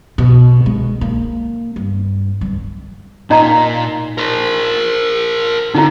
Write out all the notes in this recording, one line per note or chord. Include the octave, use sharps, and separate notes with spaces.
B2
G#3
A#3
G2
G2
A#2 D#4 D#5 A#5
A#4 C5
D3 D#4 E4